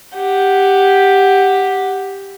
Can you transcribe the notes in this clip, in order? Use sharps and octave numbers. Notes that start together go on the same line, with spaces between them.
G4 F#5